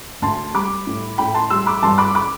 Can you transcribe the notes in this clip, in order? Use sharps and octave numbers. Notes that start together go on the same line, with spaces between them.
D2 A5 C6
G3 B5 D6
A2
A2 G5 B5
A5 C6
G3 C6 E6
B5 D6
G2 A5 C6
B5 D6
B5 D6